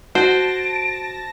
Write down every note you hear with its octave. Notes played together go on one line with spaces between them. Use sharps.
F#4 C5 A5 A#6 D7